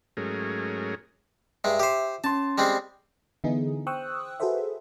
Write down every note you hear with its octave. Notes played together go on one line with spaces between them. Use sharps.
G#2 F#3 A3 C#4 G#4 A#4
G2 G#3 E5
G4 C5
C#4 A5 C6
G3 G#3 C4
D3 E3 B3 D#4 E4 G#4
C5 G5 C#6 D#6 E6 F#6
F#4 G#4 A4 B4 C5 E5